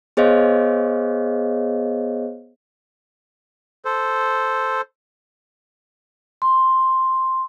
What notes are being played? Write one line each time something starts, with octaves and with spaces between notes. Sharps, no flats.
B3 G#4 C5 C#5 D#5 F5
A4 C5
C6